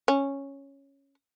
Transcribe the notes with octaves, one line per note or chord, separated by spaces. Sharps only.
C#4